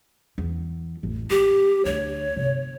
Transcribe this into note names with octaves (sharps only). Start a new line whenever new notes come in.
E2
A1 F2
G#3 G4
D2 D4 C#5
G1 C3